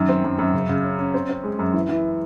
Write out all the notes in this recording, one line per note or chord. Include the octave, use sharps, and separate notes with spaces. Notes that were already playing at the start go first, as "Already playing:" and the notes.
Already playing: F#2 D#3
C4
F#2
F#2
C#3
C#3
C#4
C#4
C4
C4
G#3
F#2
E3
E3